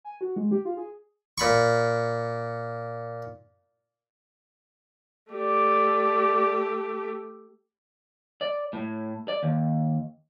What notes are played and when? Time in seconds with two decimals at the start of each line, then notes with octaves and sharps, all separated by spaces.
0.05 G#5
0.21 F#4
0.36 G#3
0.51 G4
0.65 F4
0.77 G#4
1.38 A#2 B5 C#6
5.32 A3 G4 D5
8.41 D5
8.73 A2
9.28 D5
9.43 D#2